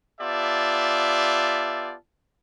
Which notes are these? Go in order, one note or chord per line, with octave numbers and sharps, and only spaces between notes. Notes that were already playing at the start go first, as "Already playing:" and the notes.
B3 F4 G4 D5 E5 A5